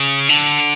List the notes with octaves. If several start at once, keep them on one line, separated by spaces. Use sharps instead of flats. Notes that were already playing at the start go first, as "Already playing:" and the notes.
Already playing: C#3
D3